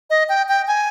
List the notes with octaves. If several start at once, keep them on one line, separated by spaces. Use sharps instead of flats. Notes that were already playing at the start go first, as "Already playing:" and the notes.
D#5
G5
G5
G#5